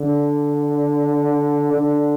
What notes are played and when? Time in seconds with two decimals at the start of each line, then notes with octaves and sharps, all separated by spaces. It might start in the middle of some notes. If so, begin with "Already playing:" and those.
Already playing: D3
1.73 D3